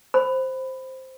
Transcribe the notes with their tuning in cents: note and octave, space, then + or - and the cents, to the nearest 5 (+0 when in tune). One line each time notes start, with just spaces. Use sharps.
C5 +0 B5 +15